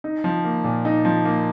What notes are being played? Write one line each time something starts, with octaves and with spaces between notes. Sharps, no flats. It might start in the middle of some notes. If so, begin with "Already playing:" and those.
D#4
F3
A#3
A#2
D#4
F3
A#3